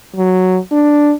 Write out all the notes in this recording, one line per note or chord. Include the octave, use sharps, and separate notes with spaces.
F#3
D4